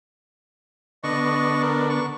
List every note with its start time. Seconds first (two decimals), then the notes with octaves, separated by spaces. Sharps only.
1.04 D3 B3 D4 D#5 C#6
1.63 A#4
1.90 C#6